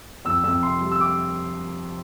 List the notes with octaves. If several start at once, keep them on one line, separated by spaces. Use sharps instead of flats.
F2 E6
F2 E6
C3 C6
G3
E6
D6